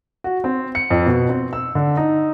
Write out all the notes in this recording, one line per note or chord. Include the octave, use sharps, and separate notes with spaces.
F#4
C4
C#7
F2
B2
C4
E6
D3
D#4